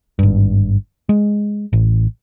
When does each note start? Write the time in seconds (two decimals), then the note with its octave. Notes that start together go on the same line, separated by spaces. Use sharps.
0.19 G#1 G2
1.09 G#3
1.73 A1